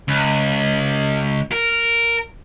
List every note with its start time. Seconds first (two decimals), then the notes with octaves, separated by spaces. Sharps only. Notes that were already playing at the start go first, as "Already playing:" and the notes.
0.08 C#2
1.52 A#4